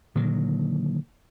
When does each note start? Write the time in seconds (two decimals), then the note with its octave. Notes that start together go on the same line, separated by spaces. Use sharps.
0.15 A#2 D3 D#3 F#3